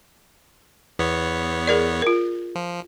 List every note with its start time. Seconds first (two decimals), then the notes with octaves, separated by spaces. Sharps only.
0.99 E2 B3 C#5
1.67 G#4 A#4 D5
2.02 F4 A#4
2.55 F3